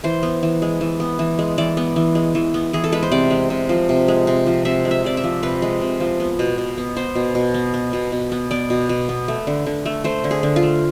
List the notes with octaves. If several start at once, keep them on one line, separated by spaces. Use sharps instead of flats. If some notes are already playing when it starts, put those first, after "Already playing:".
E3 C5
B3
E3
G#3
E3
B3
E3
G#3
E3 D5
B3
E3
G#3
E3
B3
E3 G#4
A4
G#3 B4
C5
C3 D5
G#3
C3
F3
C3
G#3
C3
F3
C3 E5
G#3
E5
C3 D5
E5
F3
C3 B4
G#3
C3
F3
B3
B2
B2
B3
B3 C5
B2
B2
B3
B3
B2
B2
B3
B3 D5
B2
B2
B3
A3
D3
D3
A3
A3 C5
D3
G#4
D3
F4
A3